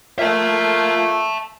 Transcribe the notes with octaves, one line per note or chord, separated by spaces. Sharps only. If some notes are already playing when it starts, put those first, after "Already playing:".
F3 A#3 F4 E5 A5